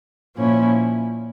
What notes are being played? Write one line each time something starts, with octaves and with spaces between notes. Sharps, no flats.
A#2 F3 C#4 E4